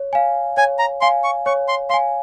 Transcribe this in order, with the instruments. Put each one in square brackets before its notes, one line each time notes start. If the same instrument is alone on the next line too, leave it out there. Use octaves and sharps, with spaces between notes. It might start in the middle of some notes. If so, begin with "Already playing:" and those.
Already playing: [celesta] C#5
F5 G#5
[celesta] C#5 [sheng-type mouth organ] G#5
[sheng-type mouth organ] A#5
[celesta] F5 G#5 [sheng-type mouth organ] C6
[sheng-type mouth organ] C#6
[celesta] C#5 [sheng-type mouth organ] C#6
[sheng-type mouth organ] C6
[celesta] F5 [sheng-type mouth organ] C6
[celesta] G#5